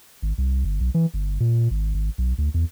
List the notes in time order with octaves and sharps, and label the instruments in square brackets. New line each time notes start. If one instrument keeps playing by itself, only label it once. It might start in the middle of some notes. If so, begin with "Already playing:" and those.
[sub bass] G#1
C2
G1
B1
E3
G1
A#2
G#1
G#1
B1
D2
E2